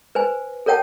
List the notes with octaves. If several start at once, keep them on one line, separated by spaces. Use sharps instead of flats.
B4 C5 G#5
A4 A#4 C#5 F#5 G5 A5